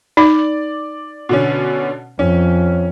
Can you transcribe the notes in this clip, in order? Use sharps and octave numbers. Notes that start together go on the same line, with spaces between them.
D#4 D5
B2 D3 C#4
F2 C#4